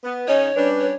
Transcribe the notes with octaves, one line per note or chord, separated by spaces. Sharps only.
B3
C#3 C#4 D#4 C#5
G3 C#4 D4 B4
C#5